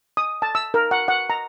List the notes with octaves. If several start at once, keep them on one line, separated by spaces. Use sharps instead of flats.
D#6
A5
E6
A#4
F#5
F#5
A#5